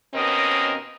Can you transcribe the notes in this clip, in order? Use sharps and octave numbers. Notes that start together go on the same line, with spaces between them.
D#2 B2 C4 C#4 A#4 D#5